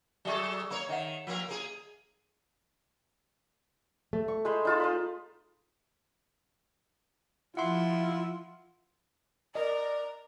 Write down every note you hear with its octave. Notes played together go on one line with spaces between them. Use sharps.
F#3 G#4 A4 D5 E5 C#6
A#3 A#4 C#5
D#3 D#5 E5 F#5
F3 A#3 A#4
A#3 G#4
A3
C#6
G#3 C5 B5
D#4 F4 A5
C5 D#5 B5
F3 E4 F4 F#5 C6
A#4 D5 D#5 A#5